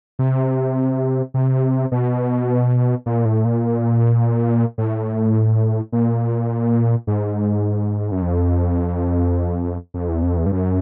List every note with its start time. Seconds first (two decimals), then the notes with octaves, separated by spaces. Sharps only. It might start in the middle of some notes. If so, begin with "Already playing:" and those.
0.19 C3
1.34 C3
1.92 B2
3.06 A#2
3.25 A2
3.45 A#2
4.78 A2
5.92 A#2
7.07 G#2
8.12 F#2
8.22 F2
9.94 F2
10.09 E2
10.22 F2
10.37 E2
10.46 G2
10.52 F#2